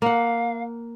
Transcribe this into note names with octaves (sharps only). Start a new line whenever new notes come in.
A#3 F5 F#5